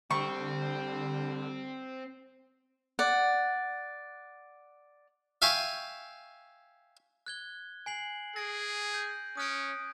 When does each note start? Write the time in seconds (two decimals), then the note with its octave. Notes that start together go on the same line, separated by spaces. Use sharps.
0.11 D3 G3 C4 C#6
2.99 D5 F#5
5.42 E5 F5 G5 G#5 C#6
7.26 F#6 G#6 G7
7.86 G#5 C7 F#7
8.36 G#4 A#6 D7
8.94 G6
9.37 C#4 D#6 F#6 D7